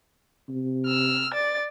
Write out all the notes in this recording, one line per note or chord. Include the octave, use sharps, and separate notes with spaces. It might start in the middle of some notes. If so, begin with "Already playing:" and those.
C3
E6 F6
D5 A6